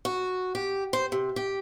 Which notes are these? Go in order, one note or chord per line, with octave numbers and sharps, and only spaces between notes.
F#4
G4
C5
C3
G4